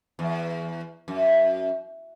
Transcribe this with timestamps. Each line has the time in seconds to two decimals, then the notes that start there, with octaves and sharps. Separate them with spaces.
0.19 E2
1.08 F#2